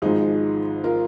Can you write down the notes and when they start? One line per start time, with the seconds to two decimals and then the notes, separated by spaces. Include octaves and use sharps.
0.02 G#1 G#2 F3 D#4 G#4
0.84 F4 A#4